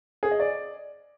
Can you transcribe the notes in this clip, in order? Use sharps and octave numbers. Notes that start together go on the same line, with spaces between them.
G#4
D#5
D5